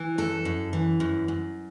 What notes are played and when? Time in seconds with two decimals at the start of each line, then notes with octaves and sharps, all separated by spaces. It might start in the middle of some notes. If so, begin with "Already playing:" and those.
Already playing: E3
0.18 F#2 A4
0.45 F#2
0.73 E3
1.00 F#2
1.28 F#2